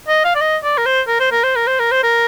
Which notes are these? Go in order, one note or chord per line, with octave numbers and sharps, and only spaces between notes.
D#5
F5
D5
D#5
D5
A#4
C5
A#4
C5
A#4
C5
A#4
C5
A#4
C5
A#4